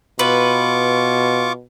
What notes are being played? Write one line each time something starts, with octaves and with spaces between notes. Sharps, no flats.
B2 F4 B4 C#6 D6